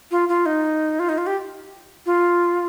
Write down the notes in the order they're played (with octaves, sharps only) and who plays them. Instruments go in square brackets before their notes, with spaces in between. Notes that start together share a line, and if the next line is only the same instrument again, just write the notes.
[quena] F4
F4
D#4
F4
D#4
F4
G4
F4